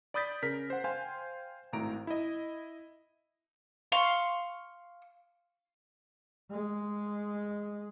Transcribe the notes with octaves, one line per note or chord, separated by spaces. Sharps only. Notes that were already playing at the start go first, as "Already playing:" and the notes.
D5 B5 D#6 G6 A6 B6
C#3 A#4 B6
C5 F#5
C5 F5 G5 G#5 C6
G#1 A2 A#5 D7
E4 D#5
F5 C6 C#6
G#3